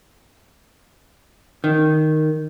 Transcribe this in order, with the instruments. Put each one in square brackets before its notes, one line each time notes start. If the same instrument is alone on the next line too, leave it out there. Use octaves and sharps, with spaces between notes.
[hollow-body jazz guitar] D#3